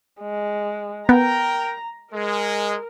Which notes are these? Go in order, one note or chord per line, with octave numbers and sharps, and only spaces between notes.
G#3
B3 A#4 G5 A#5
G#3 A#4